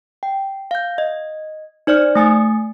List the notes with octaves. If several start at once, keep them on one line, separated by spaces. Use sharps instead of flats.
G5
F5 G6
D#5
D#4 C5 D5 F6
A3 G#5 D#6 A6